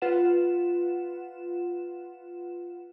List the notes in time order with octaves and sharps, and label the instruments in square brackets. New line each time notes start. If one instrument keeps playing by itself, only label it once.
[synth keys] F4 B4 F#5 E7